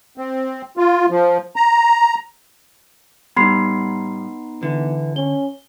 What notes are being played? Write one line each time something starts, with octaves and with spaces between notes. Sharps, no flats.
C4
F4
F3
A#5
A2 G3 B3 D#4 B5 C6 C7
D3 E3
C#4 G7